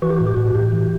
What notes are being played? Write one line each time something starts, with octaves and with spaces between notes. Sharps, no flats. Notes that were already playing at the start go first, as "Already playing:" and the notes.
E3 F#4
G4
A2 F#4
G4
A2 F#4
A2 G4
E3